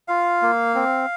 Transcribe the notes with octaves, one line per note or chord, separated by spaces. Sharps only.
F4 F5
A#3
C4